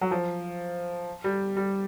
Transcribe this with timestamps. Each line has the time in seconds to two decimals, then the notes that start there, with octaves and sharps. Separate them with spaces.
0.01 F#3
0.11 F3
1.24 G3
1.57 G3